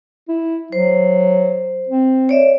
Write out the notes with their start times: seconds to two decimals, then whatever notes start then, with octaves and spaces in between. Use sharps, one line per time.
0.28 E4
0.73 F#3 C5
1.89 C4
2.29 C#5 D5 E5